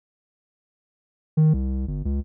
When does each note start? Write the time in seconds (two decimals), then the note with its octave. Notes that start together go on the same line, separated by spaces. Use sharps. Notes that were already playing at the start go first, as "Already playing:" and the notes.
1.37 D#3
1.53 C2
1.87 G1
2.05 C#2